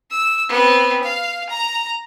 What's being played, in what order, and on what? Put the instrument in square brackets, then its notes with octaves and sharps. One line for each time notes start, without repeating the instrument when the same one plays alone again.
[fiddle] E6
B3 C4
F5
A#5